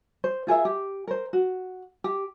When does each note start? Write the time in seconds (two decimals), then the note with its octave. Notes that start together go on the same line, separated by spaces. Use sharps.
0.24 C5
0.47 F4 G#4 A#4 E5
0.65 G4
1.08 A#4 C5
1.33 F#4
2.04 G4